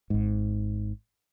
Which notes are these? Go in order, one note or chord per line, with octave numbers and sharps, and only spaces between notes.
G#1 G#2